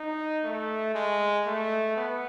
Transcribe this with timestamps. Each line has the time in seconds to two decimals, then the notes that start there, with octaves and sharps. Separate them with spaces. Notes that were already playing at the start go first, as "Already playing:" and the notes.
Already playing: D#4
0.44 A3
0.94 G#3
1.46 A3
1.96 B3